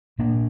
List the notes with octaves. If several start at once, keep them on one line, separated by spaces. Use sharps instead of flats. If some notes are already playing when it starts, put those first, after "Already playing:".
A#2 A#3 D4